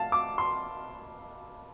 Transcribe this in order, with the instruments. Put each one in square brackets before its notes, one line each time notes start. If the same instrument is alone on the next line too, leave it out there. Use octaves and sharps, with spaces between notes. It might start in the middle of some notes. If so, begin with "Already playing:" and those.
Already playing: [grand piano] F5 A5
D6
C6